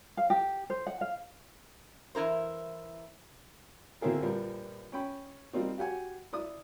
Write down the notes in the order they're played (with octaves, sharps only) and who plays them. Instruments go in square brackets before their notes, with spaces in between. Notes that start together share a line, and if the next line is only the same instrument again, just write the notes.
[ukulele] F5
G4
C5
F#5
F5
[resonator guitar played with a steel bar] E3 E4 A#4 C5
[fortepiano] D3 A#3 C4 E4 G#4 A#4
A#1 F3 G3 A#4 B4
C#4 G5 B5
F3 G3 A#3 C4 D#4
F#4 G4 F#5 G#5
E4 D5 D#6